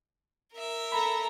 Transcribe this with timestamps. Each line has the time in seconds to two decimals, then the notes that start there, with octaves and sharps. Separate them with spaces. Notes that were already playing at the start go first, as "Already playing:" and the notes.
0.53 A#4 E5
0.92 A4 A#5 B5